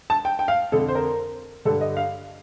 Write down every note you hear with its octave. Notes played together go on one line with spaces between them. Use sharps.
A5
G5
G5
F5
F2 D3 A4
C5
A#4
G2 D3 A4
D#5
F5